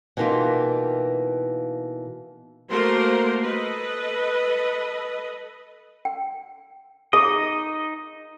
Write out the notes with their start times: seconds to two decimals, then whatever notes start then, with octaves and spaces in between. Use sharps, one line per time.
0.17 B2 E3 A#3 D#4 F4 G4
2.70 A3 A#3 F#4 A#4 C5 C6
3.41 A4 B4 D#5
6.05 G5
7.13 D#4 G#4 D#5 D6 D#6